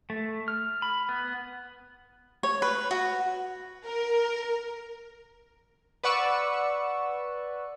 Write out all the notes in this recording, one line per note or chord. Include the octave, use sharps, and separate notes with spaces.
A3
F6
B5
B3
C#5
B4
F#4
A#4
B4 D5 F#5 C#6 E6